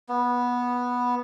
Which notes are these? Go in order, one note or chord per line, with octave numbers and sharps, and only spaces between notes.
B3